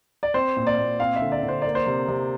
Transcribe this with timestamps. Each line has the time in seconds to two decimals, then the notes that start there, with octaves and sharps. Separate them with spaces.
0.23 D5
0.34 C4 C5
0.57 A#2
0.67 D5
0.78 A#2
1.00 C4 F5
1.16 E5
1.21 D3
1.32 D5
1.43 D3
1.48 C5
1.62 A#3 D5
1.75 C5
1.86 C3
2.08 C3